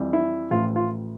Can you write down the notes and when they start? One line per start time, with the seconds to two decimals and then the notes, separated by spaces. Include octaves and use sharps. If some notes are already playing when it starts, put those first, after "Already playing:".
Already playing: F2 E3 G3
0.13 E4
0.51 A1 A2 F3 F4
0.76 F4